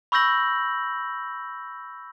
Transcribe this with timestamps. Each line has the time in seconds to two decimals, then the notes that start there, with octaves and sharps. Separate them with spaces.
0.12 B5 C#6 E6 G6 A#6 F#7